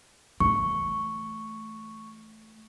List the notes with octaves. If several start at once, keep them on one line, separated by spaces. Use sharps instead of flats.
E3 A3 C#6